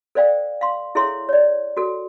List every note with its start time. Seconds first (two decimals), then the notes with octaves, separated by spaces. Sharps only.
0.15 A4 C5 D5 F5 G5
0.61 F5 C6
0.95 E4 G#4 A4 C#5 E5 C6
1.29 C#5 D5
1.77 F#4 A4